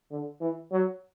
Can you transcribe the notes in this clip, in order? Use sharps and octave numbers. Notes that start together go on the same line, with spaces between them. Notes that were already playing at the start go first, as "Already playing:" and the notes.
D3
E3
F#3